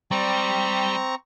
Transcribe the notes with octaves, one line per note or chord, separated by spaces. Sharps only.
G3 C4 A#5 C#6